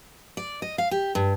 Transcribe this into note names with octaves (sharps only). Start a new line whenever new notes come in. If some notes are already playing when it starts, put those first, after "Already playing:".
D5
D#5
F5
G4
G2